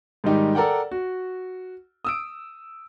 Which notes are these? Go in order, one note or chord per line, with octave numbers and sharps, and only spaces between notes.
G#2 D#3 G3 D#4 G4
A4 A#4 D5 F#5 G5
F#4
D#6 E6 D7